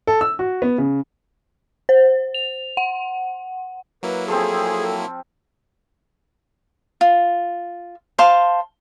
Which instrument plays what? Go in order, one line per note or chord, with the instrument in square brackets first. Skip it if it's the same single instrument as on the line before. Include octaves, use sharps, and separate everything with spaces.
[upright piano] A4
E6
F#4
B3
C#3
[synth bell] C5
F7
F#5
[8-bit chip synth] F#3 A#3 E4 [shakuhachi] B4
[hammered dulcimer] F3 C4 [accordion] G#4 [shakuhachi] A4
[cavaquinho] F4
C5 F5 A5 C6